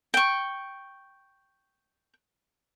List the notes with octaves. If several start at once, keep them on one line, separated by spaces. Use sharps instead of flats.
G5 C#6